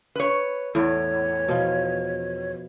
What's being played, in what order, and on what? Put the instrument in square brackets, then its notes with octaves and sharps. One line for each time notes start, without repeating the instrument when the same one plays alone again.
[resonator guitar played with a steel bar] B4 C#5
[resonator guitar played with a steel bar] E2 [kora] A2 [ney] C#5
[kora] B2 F3 F4